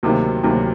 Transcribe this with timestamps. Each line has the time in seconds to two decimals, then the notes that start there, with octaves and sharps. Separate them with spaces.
0.03 D2 C3 D#3 F#3 A#3
0.43 D2 C3 D#3 F#3 A#3